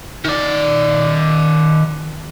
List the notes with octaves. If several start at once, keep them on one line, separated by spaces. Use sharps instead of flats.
D#3 D5